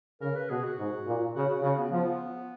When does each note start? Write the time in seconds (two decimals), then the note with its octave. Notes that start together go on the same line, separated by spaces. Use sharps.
0.21 C#3 A#4
0.36 B4
0.50 B2 G#4
0.64 F#4
0.78 G#2
1.07 A#2
1.35 C#3 F#4
1.49 F#4
1.62 C#3 F#4
1.78 B3
1.91 F3 B3